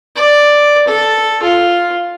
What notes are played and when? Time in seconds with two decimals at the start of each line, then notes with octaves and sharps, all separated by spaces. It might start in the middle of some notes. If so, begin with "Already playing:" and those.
0.16 D5
0.88 A4
1.42 F4